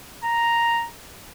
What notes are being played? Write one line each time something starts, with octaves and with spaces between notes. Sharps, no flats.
A#5